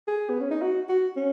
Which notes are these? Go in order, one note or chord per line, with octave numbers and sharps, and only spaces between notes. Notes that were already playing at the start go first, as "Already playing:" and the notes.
G#4
B3
C#4
D#4
F#4
F#4
C#4